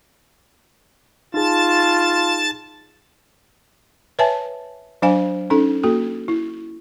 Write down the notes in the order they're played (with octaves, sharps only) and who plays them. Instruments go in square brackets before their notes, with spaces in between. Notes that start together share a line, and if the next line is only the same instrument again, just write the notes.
[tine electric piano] D#4 G#4 [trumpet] F4 [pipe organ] A5 A6
[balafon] B4 C#5 E5 G#5 A5
F#3 D4 C5 F5 G#5
C#4 D#4 A4
A#3 F#4 A4
E4